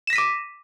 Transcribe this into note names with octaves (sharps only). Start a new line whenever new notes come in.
D6 A#6 B6 D#7 E7